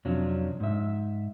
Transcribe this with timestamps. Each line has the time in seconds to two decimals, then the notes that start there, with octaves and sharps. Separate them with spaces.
0.05 F2 C3 F#3 C#4 D4 F4
0.60 G#2 E5